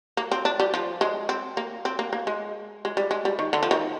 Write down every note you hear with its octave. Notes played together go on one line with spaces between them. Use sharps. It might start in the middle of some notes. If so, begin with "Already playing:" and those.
A#3
C4
D4
G3
F3
G#3
C4
A#3
C4
A#3
A#3
G#3
G#3
G3
G#3
G3
D#3
D3
F3
D#3